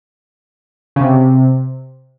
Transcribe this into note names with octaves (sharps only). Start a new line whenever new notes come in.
C#3
C3